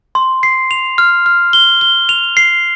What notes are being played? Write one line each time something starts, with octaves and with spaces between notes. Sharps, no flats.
C6
C7
F7
F6
F6
G7
G7
F7
C7